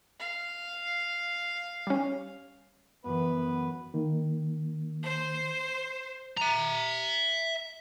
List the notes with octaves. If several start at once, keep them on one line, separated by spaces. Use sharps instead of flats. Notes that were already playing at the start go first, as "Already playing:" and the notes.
F5
G3 C#4
F#2 E3 B3 B4
D#3 A#3
C5
E5 A#5